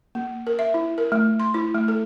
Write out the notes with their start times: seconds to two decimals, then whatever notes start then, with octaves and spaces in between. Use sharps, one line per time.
0.15 A#3
0.47 A#4
0.59 E5
0.74 E4
0.98 A#4
1.12 A3
1.40 C6
1.54 E4
1.75 A3
1.88 A4